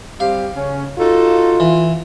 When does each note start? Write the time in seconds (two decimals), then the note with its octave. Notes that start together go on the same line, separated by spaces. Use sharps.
0.20 G3 C4 G4 F5
0.56 C#3 C#4
0.98 D#4 F4 F#4 A4
1.60 E3